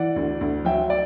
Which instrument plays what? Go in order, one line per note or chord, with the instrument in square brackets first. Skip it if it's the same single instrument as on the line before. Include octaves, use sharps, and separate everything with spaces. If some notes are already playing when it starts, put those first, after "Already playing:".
Already playing: [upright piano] E3 [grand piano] D5 F#5
[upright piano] D2
D2
[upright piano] F#3 [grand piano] E5 G5
[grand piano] D5